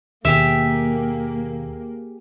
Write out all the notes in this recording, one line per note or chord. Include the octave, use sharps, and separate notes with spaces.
D#2 B2 D#3 A#3 G4 G#4 E5 G5